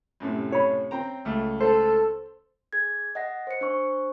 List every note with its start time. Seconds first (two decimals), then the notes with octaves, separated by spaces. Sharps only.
0.20 F#2 A2 C3
0.52 C#5 B5
0.91 C4 G5 A#5
1.25 C#2 A3
1.61 A4 C5
2.73 G#4 G#6
3.15 D#5 F#5 A#6
3.47 C5 C#7
3.61 D4 C5 C#6